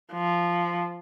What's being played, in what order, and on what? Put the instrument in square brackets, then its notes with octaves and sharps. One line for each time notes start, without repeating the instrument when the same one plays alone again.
[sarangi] F3